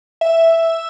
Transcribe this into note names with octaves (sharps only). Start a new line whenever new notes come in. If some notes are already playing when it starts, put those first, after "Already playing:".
E5